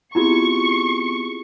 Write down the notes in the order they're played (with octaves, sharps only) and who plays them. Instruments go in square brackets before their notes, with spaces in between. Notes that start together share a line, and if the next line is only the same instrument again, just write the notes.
[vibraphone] B3 C4 G#4 [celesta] E4 F4 G4 [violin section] C#6 C#7